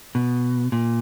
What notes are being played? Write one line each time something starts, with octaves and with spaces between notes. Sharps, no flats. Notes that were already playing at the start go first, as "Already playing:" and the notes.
B2
A#2